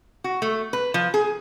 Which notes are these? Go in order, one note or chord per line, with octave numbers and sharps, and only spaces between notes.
F#4
A3
B4
F3
G#4